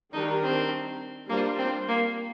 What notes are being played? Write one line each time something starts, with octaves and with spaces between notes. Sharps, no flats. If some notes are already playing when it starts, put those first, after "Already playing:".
D#3 G3 D4 D#4 G4 A#4
C4
G3 A#3 D4 F4 C5
C4
A#3